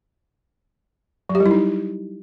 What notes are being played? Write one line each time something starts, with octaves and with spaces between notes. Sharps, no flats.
F#3
G4
G3
E4
D#4